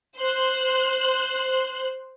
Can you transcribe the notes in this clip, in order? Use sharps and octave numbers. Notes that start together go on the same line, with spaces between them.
C5 F#6